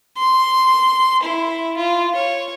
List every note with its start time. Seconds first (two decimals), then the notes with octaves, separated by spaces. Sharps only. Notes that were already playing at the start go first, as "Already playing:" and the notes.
0.17 C6
1.23 E4
1.77 F4
2.15 C#5